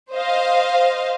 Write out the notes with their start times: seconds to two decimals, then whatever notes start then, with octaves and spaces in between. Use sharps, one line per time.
0.12 C5 D#5 F5